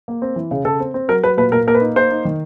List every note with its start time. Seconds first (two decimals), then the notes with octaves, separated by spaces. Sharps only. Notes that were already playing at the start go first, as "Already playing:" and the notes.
0.08 A#3
0.22 C4
0.36 E3
0.51 C#3
0.65 C#3 A4
0.80 C4
0.94 C4
1.08 F#3 A#4
1.23 F#3 B4
1.37 A#2 B4
1.52 A#2 A#4
1.67 A#3 A#4
1.75 B4
1.81 D#4
1.96 A#3 C5
2.11 D#4
2.25 D#3